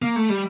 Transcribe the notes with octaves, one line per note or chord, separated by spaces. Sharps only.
A#3
A3
G3